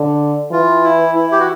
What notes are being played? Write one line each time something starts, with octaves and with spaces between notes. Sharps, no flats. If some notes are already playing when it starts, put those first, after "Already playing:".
Already playing: D3
E3 F4
E4
E4
G4
F#4